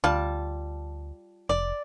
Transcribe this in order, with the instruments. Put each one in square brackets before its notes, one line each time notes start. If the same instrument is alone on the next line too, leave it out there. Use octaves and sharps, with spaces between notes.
[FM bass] D2 [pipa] G3 F4 A5
[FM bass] F1 [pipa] D5